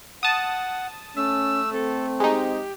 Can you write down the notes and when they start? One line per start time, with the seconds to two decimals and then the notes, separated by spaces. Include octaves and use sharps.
0.23 F#5 A5 D#6
1.16 A3 C#4 E6
1.73 C4 A4
2.20 G#3 D#4 G4